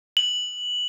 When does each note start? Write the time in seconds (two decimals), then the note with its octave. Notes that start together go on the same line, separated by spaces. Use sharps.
0.17 F#7